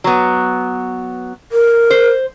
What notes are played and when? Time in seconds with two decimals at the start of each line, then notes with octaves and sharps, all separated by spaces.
0.04 F#3 B3
1.52 A#4
1.90 C5